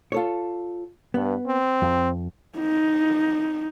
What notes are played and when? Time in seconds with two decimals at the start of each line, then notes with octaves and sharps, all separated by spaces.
0.12 F4 A4 C#5
1.14 G2 B3
1.47 C4
1.82 F2
2.58 D#4